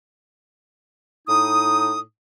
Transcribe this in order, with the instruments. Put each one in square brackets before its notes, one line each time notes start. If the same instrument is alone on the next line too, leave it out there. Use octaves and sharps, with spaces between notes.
[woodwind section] A2 D#4 D#6